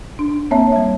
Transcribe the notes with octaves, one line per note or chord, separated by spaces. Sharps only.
D4
A#3 C4 C#5 E5 A5
G3 E5